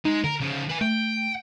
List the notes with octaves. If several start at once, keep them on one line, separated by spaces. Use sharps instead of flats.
G#3 D#4
D3 A#4
C#3 F3
B4 G#5
A3 G5